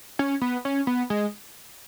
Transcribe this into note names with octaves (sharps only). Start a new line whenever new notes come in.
C#4
B3
C#4
B3
G#3